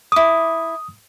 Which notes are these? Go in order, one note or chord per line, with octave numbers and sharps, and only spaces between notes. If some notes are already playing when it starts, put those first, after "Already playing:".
E4 D6 D#6